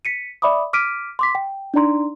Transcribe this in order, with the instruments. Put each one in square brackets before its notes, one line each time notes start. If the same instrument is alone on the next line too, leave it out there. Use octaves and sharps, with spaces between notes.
[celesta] B6 C#7 D#7
D5 E5 B5 D6 D#6
D6 F6 B6 D7 D#7
C6 D6 B6
G5
D4 D#4 D5 A#5 C6